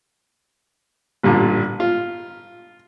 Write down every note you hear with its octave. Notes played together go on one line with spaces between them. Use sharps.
A1 G2 A#2 D3
F4